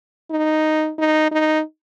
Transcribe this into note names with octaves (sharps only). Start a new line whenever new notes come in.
D#4
D#4
D#4